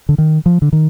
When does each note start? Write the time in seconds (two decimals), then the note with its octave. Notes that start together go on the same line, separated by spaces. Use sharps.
0.09 D3
0.18 D#3
0.46 F3
0.62 D3
0.73 D#3